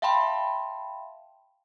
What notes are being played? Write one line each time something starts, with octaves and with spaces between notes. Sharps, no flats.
E5 F5 G5 A5 B5 C6